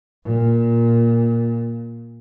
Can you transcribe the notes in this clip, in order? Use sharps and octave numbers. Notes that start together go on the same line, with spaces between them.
A#2